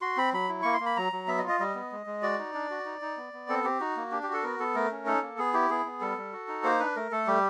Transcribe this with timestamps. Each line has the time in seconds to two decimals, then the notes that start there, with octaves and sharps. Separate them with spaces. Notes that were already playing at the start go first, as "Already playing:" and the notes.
0.01 F#4 C6
0.17 C4 B5
0.33 F#3 B5
0.49 E4
0.62 A#3 C#6
0.73 C6
0.80 A#3
0.86 B5
0.97 F#3 A#5
1.13 F#3
1.27 B3 E5
1.38 D#5
1.44 F4
1.49 D#5
1.60 G3 D#5
1.75 B3
1.92 G#3
2.06 G#3
2.22 F#4 D5
2.38 D#4
2.54 D4
2.70 F#4
2.85 D#4
3.01 D#4
3.17 B3
3.33 B3
3.49 C4 A4
3.64 C4 G4
3.80 D#4 F#4
3.96 A#3
4.11 D4 G4
4.23 G4
4.28 F#4 A4
4.43 B3 A#4
4.59 B3 A4
4.75 A3 A#4
4.91 C#4
5.06 D#4 A4
5.22 A#3
5.38 B3 G#4
5.53 E4 G4
5.70 B3 G#4
5.85 B3
6.01 G3 A4
6.17 G3
6.33 F#4
6.48 D#4
6.64 A#3 C5
6.79 D4 B4
6.96 A3 A#4
7.11 A3 A4
7.27 G3 G4